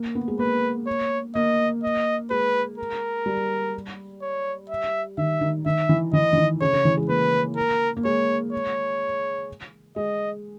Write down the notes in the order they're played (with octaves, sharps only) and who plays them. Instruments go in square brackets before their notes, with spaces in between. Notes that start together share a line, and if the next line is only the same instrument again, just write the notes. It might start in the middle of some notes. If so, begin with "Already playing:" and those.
Already playing: [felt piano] A#3
B3
G#3
[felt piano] A#3 [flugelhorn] B4
[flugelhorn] C#5
[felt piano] A#3 [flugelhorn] D#5
[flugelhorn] D#5
[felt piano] G#3 [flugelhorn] B4
[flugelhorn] A#4
[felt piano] G3
[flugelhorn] C#5
E5
[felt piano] D#3 [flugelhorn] E5
[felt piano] D#3
[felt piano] D#3 [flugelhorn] E5
[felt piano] E3
[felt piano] E3 [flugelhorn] D#5
[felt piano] E3
D#3
[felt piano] C#3 [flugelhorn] C#5
[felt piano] C#3
E3
G#3
[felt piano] A#3 [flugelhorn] B4
[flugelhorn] A#4
[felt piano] A#3
[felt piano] G#3 [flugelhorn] C#5
[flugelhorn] C#5
[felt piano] G#3 [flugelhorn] D#5